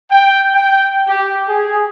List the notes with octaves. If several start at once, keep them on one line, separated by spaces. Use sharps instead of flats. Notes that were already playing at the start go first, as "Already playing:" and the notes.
G5
G5
G4
G#4